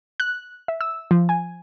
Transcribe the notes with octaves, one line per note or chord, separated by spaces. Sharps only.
F#6
E5
E6
F3
G#5